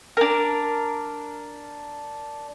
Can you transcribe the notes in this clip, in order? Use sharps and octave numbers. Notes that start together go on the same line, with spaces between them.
D4 A#4